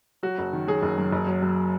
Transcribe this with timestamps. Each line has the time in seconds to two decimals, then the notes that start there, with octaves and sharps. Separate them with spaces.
0.23 F#3 F#4
0.38 F#1
0.53 D#3
0.68 F#3 G#4
0.82 F#1
0.98 F#2
1.12 F#1
1.27 F#3
1.42 F#2